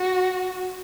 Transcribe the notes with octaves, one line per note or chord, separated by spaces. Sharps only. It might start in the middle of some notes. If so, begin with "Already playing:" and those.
Already playing: F#4